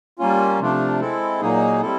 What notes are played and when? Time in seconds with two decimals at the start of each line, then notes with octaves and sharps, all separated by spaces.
0.19 G3 A#3 C#4 F4
0.60 C3 F3 A3 D4 F4
1.01 G#3 C4 E4 A4
1.41 A#2 F#3 A#3 D#4 G#4
1.80 G3 C4 E4 A4